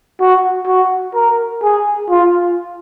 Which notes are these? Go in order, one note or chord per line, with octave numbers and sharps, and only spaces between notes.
F#4
F#4
A#4
G#4
F4